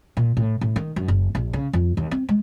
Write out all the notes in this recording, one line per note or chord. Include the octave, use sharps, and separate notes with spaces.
A#2
A2
A2
D#3
F#2
F#1
A#1
C#3
F2
D#2
C4
G#3